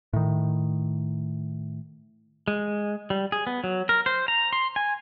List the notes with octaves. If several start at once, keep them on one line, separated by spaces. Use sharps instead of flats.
A2 D#3
G#3
G3
G#4
B3
F#3
A#4
C5
A#5
C6
G#5